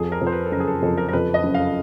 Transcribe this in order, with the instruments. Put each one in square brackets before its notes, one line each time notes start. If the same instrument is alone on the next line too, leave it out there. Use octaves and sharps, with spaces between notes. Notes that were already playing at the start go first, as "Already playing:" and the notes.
Already playing: [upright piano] F2 [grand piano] G#4
[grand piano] A#4
[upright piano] F2
[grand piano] C5
B4
A4
[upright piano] F#1 [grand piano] A#4
[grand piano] G#4
A4
[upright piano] F2 [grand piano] A4
[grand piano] A#4
A#4
[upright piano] F2 [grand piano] B4
[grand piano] D#5
[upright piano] F#1
[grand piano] F5